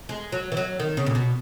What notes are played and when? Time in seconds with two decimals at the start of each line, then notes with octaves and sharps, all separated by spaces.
0.09 G#3
0.32 F#3
0.52 E3
0.57 F#3
0.80 D#3
0.97 C#3
1.06 A#2
1.15 B2